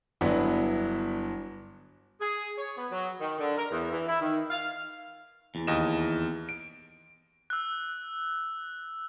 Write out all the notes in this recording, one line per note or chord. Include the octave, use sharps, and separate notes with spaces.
G1 F#3 B3 D4 E4 B4
G#4
C#5
B3
F#3
D#3
D3
A#4
E2
E3
E4
D#3
F5
E2
D#2 D#5 E7
D7
E6 F#6